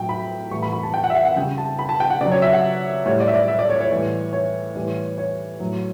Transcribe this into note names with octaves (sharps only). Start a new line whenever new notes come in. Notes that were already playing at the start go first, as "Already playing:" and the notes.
Already playing: A2 F#3 G5
B5
A2 E3 G3 C#6
B5
B5
A5
G5
F#5
E5
F#5
F#5
C#3 G3 G5
A5
B5
A5
G5
F#5
C#3 F#3 D5
C#5
E5
F#5
A2 G3 C#5
D5
E5
D5
E5
D5
C#5
C#5
A2 E3 G3
C#5
A2 E3 G3
C#5
A2 F#3